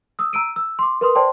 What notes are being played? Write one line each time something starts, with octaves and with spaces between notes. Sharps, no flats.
D#6 E6
A#5 E6 D7 D#7
E6
C6 D6
A#4 B4 C6 D#6
C5 D5 G5 A5 C6